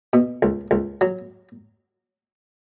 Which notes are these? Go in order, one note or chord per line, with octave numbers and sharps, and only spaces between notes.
B2
C#2
C#2
F#3